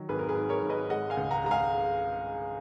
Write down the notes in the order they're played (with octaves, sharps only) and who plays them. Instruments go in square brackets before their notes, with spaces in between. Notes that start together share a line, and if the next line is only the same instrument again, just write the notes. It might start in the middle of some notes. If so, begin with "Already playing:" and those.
Already playing: [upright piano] D#3 F#3
G#1 G#4 B4
A#4
G#4 B4
G#2
A#4 C#5
G#1
B4 D#5
G#3 D#5 F#5
F5 G#5
C#2
F#5 A#5
G#3 A#5
F5 G#5